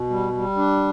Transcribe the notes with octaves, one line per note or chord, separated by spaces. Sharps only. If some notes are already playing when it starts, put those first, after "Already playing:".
Already playing: B2
G3
G3
D4